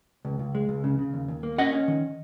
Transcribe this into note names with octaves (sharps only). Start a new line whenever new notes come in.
C#2
C#2
G#3
C#2
C#3
C#3
D#2
D#2
A#3
C#4 D#5 F#5
C#4
D#3